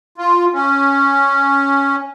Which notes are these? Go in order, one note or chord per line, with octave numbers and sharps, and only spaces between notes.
F4
C#4